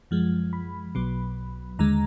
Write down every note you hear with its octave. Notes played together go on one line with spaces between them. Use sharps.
F#2 F3 G#3
B5
B1 B2 F#3
D#2 D3 G#3 A#5